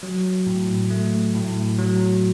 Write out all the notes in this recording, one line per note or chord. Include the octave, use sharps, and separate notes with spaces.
F#3
A2
A3
A2
F#3